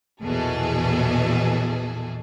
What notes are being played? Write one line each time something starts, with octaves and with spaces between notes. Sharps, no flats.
A#1 E2 B2 G#4 A4